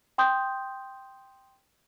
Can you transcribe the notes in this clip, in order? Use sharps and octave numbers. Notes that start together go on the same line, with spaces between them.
G5 C6 D#6 G6